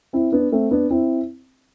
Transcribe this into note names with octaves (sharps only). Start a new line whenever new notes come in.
C4 E4
B3 D4
A3 C4
B3 D4
C4 E4